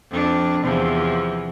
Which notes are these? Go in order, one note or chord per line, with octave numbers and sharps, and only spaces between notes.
F2 D4
E2 C3 F3